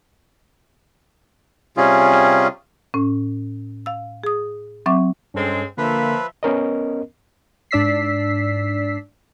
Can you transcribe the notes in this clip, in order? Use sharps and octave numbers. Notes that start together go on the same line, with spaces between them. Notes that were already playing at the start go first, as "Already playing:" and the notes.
C3 G3 C#4 F4 G#4
A2 C#4
F5 E6
G#4 D#6
F#3 C4 E5 C#6 D6
G2 G#3 C4 C#4 A4
D3 F3 A#3 B4 E5
B3 C#4 A#4 D#5
G#2 D4 D5 E6 B6 C7